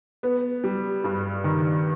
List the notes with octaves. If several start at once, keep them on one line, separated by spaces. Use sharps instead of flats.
B3
G3
G2
D#3